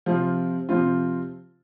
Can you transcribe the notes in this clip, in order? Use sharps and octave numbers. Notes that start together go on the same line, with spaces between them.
C3 F3 C4 F4
C3 F3 C4 F4